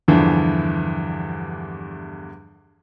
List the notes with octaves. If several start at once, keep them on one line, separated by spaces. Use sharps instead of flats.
E2 G2 D3 E3 F3